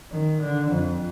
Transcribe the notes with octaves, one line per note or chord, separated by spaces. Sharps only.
D#3
D3
F2